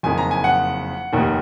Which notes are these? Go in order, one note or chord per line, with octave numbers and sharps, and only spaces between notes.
F#1 F2 D#3 G#5
A#5
G#5
F#5
F1 D#2 D#3